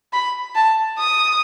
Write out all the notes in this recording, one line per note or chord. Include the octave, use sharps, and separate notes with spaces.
B5
A5
D#6